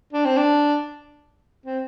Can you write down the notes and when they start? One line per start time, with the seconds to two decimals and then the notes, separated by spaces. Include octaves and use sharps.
0.13 D4
0.25 C4
0.37 D4
1.66 C4